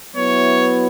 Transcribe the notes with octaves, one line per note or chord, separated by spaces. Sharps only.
F#3 B3 E4 C#5